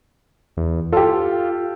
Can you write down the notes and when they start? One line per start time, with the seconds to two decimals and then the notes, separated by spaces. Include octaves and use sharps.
0.57 E2
0.92 F4 G4 A4